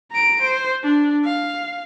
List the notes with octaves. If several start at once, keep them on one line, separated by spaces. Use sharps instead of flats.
A#5 D7
C5
D4
F5